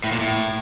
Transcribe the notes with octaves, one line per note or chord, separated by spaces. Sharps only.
A2
A#2
A2